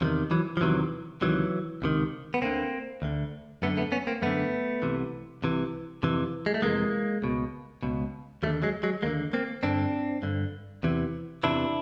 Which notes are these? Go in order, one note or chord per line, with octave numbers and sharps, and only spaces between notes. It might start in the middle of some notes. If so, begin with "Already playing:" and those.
E2 C3 D#3 F3
E3 F#3
F3
E2 C3 D#3 E3 F#3
C#2 C3 D#3 E3 F#3
C#2 C3 D#3
B3
D2 D3 A#3 C4
D2 D3
F#2 D3 A3 B3
A3 B3
B3 C#4
A#3 C4
F#2 D3 A3 B3
C2 C3 E3
C2 C3 E3
F2 C3 E3
G#3
A3
F2 C3 E3 G#3 A#3
C#2 B2
C#2 B2
D#2 D3 G3 A3
F#3 G#3
F#3 G#3
D#2 D3 G#3 A#3
A#3 C4
G2 D3 C4 D4
G2 D3
E2 C3 E3
E2 C3 E3 D4 E4